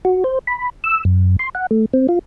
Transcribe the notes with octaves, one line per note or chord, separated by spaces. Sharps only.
F#4
C5
B5
E6
F#2
C6
F#5
A3
C4
F4